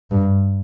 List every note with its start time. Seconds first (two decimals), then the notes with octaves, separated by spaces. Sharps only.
0.11 G2